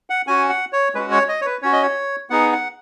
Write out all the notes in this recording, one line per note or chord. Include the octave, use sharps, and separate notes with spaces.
F#5
C#4 F#4 G#5
F#5
C#5
G#3 C#4 F#4 B4
C#5
D#5
C#5
B4
C#4 F#4 C#5
D#5
C#5
B3 D#4 G#4 F#5
F#5